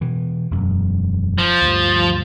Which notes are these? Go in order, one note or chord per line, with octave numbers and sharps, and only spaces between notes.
B2 E3
E1 F#2
F3
D2 G2